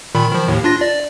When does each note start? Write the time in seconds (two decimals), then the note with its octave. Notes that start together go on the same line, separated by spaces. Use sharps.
0.15 A#2 D#3 B5
0.31 D#3 F3
0.48 D#2 A2
0.64 D4 F4 A#6
0.81 D5